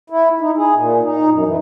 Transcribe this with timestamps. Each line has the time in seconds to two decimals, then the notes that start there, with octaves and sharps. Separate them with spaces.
0.10 E4
0.40 D#4
0.57 G#4
0.76 A#2
1.03 D#4
1.31 F#2
1.46 E3